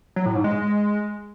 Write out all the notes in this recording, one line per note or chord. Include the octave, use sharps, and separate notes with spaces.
F#3
A2
G#2
G#3